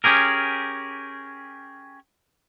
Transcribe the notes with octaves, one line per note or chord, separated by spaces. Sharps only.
C#4 G4 G#4 A#4